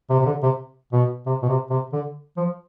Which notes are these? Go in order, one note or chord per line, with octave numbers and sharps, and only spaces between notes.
C3
C3
D3
C3
B2
C3
B2
C3
C3
D3
F3